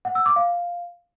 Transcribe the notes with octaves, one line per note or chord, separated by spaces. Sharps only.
F#5
E6
D6
F5